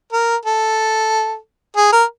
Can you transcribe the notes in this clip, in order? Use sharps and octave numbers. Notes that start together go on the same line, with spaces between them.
A#4
A4
G#4
A#4